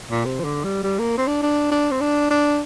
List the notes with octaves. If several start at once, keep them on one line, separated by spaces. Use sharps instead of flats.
A#2
C3
F3
D3
G3
G3
A#3
C4
D4
D4
D4
C4
D4
D4